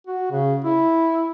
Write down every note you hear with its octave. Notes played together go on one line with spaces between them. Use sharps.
F#4
C#3
E4